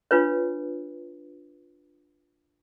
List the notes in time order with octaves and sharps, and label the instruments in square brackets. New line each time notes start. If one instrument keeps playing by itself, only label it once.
[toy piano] D4 F4 B4 C#5